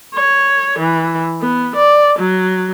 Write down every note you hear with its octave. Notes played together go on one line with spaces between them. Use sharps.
C#5
E3
B3
D5
F#3